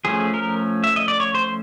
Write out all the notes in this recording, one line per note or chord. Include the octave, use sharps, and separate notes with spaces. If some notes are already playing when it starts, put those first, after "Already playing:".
F3 A3 C#4 G#4
A#4
E5
D#5
D5
C#5
C5